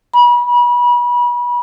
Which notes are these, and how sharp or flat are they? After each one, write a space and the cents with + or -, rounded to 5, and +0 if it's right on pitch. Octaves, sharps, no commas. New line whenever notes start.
B5 -30